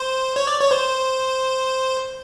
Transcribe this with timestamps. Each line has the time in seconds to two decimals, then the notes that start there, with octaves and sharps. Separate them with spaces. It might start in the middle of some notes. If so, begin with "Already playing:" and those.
Already playing: C5
0.36 C#5
0.47 D5
0.60 C#5
0.71 C5